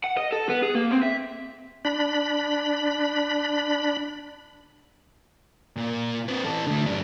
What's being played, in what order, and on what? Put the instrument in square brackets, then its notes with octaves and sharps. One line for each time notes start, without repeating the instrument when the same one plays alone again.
[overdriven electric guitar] F#5
D#5
A4
B3
G#4
A#3
C4
E5
[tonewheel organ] D4 B5
[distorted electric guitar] A#2
C4 B4
E3 A4
D3 A3
F#2 D4